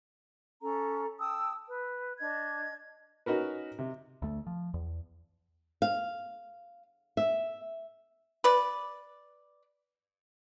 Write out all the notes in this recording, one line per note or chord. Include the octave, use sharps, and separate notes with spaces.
C#4 A4 A#5
G5 A5 D#6 E6
B4
D4 D#5 G#6
C#4 D#4 F#4 A#4 B4
C3
D2 A3
F3
E2
F5
E5
B4 D5